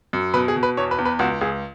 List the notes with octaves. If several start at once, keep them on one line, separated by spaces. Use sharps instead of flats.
F#2
B2 B4
G#4
B2
B4
E2 C#5
B4
E2
B4
C#2 F#4
C#2 G#4